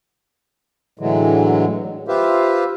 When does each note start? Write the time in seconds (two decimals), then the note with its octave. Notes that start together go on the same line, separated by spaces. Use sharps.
0.99 A2 D3 E3 F#3 G#3
2.08 F4 G4 B4 C5 E5 F5